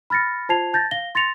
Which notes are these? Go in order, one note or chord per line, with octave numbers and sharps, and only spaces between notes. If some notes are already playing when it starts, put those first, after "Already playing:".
B5 F6 A6 A#6 C#7
F4 C5 A5 G#6 C7 F7
A5 G6 A6 A#6
F5 A#6 G7
C6 A6 A#6 C#7 F7